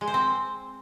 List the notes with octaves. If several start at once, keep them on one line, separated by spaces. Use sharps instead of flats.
G#3
C5
C4